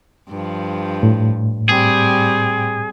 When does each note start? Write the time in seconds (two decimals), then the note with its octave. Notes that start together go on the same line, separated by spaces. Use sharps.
0.29 G2 F3
1.03 A2
1.69 G3 C4 G#4